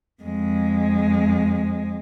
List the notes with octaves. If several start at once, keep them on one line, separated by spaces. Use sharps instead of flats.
F2 G#3